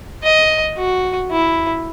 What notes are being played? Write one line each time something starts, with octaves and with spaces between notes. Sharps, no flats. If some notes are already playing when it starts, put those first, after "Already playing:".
D#5
F#4
E4